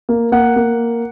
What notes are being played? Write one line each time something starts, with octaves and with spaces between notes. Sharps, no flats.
A#3
A#3 F#5
A#3